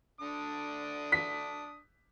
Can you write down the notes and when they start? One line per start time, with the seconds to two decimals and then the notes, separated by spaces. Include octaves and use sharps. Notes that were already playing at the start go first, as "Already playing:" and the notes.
0.20 D3 D4 D#6
1.12 B6